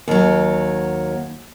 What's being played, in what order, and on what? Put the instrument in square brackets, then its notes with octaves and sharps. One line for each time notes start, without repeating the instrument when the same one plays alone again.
[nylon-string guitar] D#2 F#3